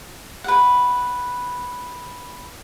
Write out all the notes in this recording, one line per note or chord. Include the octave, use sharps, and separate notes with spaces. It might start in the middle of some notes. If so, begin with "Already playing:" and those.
B4 F#5